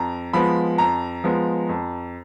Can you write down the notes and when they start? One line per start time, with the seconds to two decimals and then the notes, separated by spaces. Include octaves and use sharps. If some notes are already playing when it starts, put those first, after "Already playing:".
Already playing: F2 A#5
0.33 F3 G#3 B3 B5
0.78 F2 A#5
1.24 F3 G#3 B3
1.69 F2